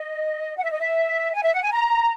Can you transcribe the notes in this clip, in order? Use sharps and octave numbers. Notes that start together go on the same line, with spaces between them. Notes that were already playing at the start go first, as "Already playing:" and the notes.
Already playing: D#5
F#5
E5
D#5
E5
G#5
E5
F#5
G#5
A#5